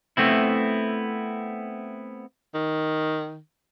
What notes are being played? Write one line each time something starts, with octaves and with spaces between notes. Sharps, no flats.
A3 B3 C4 E4
D#3